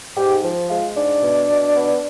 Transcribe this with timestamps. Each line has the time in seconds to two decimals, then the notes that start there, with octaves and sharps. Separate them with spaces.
0.17 G#2 G4
0.44 F3
0.69 G#3 F4
0.95 G#2 D4
1.22 B2
1.49 B2
1.75 B3